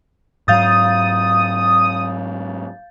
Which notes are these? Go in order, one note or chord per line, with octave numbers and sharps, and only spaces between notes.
G#2 F#3 F5 D#6 G6 A6